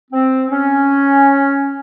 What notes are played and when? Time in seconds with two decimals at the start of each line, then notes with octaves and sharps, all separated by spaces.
0.11 C4
0.51 C#4